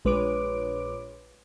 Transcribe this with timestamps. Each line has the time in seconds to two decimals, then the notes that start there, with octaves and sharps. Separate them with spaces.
0.05 A#1 G#3 B4 C#5 D6 D7